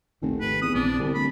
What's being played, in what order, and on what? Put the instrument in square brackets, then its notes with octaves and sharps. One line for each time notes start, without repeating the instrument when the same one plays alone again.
[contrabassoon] F1 [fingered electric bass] A#1 D#2 D#3
[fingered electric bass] G#1 [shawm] B4
[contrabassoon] E2 [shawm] D#6
[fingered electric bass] A#1 C4 [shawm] D4
[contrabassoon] C2 [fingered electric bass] D3
[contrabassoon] D1 [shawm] B5